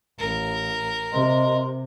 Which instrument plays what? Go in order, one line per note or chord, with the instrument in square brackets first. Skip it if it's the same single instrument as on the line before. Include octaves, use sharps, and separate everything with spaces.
[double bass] A1 [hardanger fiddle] A#4
[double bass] C3 [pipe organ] D#5 C6